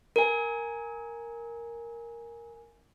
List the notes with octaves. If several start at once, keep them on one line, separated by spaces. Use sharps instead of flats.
A#4 G#5